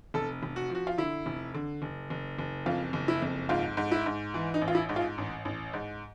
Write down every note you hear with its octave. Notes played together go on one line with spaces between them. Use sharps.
F1 A4
F1
F#4
F3 F#4
F4
D3 E4
F1
D3
F#1
F#1
F#1
F2 F4
F#1
E4
F2
G#2 F4
G#2
E4
G#2
E3
D#4
A1
F4
E4
G#2
F4
A1
A1
G#2